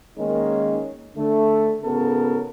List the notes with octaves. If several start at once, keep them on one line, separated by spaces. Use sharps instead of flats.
D#3 G#3 A#3 C#4 D#4
D3 A3
G#2 C#3 B3 F#4 A4 A#4